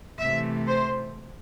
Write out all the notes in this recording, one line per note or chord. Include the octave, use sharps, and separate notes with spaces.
C3 E3 A3 E5
C5